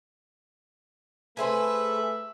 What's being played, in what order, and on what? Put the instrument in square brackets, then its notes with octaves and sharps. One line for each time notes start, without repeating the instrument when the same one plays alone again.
[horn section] A3 E5 [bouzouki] G#4 C5 G#5 [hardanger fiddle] B4